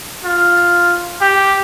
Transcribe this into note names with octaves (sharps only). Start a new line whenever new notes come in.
F4
G4